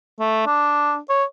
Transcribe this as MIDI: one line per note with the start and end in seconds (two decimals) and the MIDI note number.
0.19 0.43 57
0.46 0.98 62
1.09 1.24 73